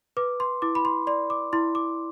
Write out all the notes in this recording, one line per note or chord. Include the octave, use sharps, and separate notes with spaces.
B4 D6
C6
E4 D6
B5
C6
D5 C6
D6
E4 C6
D6